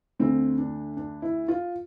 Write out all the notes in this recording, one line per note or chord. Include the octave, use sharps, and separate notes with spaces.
D2 D3 C4
D4
D4
E4
F4